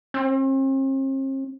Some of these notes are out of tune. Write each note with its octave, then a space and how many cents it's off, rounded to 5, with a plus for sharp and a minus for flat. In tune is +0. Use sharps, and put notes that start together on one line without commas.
C4 +45